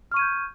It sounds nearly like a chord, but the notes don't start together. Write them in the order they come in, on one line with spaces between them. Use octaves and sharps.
F6 C#6 D#7 G#6 G6